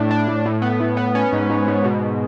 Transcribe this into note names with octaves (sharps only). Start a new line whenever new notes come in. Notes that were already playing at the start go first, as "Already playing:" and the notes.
Already playing: A2 D4
D4
A2
A2
B3
A2
B3
C#4
G#2
G#2
G#2
B2